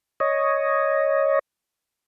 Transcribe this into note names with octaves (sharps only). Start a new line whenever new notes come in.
C#5 D#5